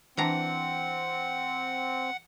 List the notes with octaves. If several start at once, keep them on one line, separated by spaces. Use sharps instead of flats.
E3 C4 D4 F#5 A#5